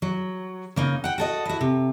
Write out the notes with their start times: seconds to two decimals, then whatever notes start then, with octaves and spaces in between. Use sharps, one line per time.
0.02 F#3
0.76 C#3 A#3 D#4
1.04 F#5 G5
1.18 F#4 A4 D#5
1.45 E4 F#4
1.61 C3